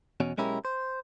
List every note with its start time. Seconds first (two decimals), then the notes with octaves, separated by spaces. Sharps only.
0.20 E2 B2 C#4
0.38 B1 G#3 C#4 E4 G4 A#4
0.65 C5